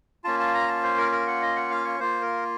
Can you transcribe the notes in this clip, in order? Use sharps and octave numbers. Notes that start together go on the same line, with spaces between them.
A#3 C#4 F4 A5
A5
A#5
A5
C5
A#4
A#4
F#5
D#5
F#5
F5
C#5
A#3 F4 C5
A#4